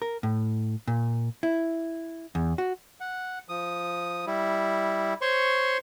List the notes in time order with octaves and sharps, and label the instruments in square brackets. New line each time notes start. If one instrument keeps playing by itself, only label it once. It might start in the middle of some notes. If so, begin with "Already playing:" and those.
[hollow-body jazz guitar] A#4
A2
A#2
E4
E2
F#4
[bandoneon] F#5
F3 D#6
G3 E4
C5 C#5 C6 C#6